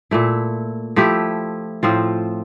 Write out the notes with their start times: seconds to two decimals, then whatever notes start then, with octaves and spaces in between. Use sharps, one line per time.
0.11 A#2 A3 E4
0.96 F3 A3 E4 G4
1.83 A2 F3 C4 F4